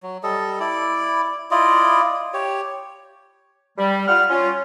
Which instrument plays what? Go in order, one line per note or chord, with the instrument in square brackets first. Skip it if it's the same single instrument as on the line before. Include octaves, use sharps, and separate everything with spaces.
[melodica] F#3
G3 A4 D#5
E4 D5
E4 F4 D5 D#5
G4 C#5
[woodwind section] G3
G3 F4 F#5 F6
C#4 F4